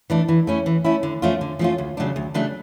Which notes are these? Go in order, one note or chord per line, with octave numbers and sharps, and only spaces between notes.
E3 A3 D4
E3
A3 C#4 E4
E3
A3 C#4 E4
D3
F3 A3 C#4 F4
D3
F3 A3 C#4 F4
D2
C#3 F#3 A3 D4
D2
C#3 F#3 A3 D4